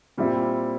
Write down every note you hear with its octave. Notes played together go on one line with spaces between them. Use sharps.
A#2 G3 C4 E4